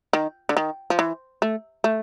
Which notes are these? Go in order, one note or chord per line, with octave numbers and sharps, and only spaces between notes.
D#3
D3
D#3
F3
E3
A3
A3